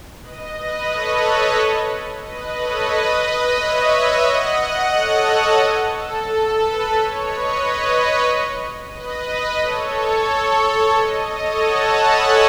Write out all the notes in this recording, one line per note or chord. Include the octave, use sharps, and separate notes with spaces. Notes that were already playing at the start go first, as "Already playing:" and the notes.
B4 D#5
B4
A4 C#5
B4 D#5
A4 C#5
B4 D#5
C#5 E5
D#5 F#5
A4 C#5
B4
A4
A4
B4
A4 C#5
B4 D#5
B4 D#5
B4
A4 C#5
B4 D#5
A4 C#5
F#5 A5
G#5 B5